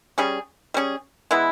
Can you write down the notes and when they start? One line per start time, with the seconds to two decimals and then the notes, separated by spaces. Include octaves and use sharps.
0.18 G3 C#4 G#4
0.74 G3 C#4 G#4
1.31 E3 G#3 B3 E4